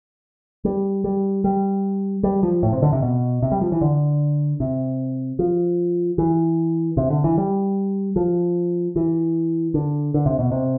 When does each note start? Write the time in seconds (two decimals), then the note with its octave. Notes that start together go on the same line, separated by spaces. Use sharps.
0.65 G3
1.04 G3
1.44 G3
2.23 G3
2.43 F3
2.63 A2
2.73 C3
2.82 D3
2.93 C3
3.02 B2
3.42 C3
3.52 G3
3.61 F3
3.72 E3
3.81 D3
4.60 C3
5.39 F3
6.18 E3
6.97 C3
7.10 D3
7.24 E3
7.38 G3
8.16 F3
8.96 E3
9.74 D3
10.14 D3
10.26 C3
10.39 B2
10.52 C3